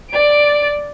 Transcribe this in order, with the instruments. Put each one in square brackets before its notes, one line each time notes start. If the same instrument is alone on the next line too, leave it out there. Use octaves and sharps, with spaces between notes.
[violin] D5 D7